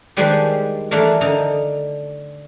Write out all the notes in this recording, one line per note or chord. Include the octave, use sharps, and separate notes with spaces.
D#3 G3 G#3 D4 B4 C5
E3 A3 D4 A#4
D3 D#4